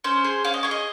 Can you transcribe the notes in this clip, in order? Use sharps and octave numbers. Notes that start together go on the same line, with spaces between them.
C#4 C5
G#4
C#4 F5
D#5
G#4 C#5
D#5